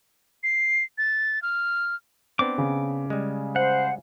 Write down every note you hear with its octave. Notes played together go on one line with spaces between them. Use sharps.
C7
A6
F6
B3 C4 D4 D6
C#3
G3 G#3
C5 F#5